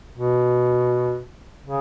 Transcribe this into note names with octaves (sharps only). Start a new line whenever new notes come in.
B2
C#3